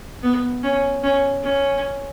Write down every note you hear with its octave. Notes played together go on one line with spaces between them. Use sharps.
B3
C#4
C#4
C#4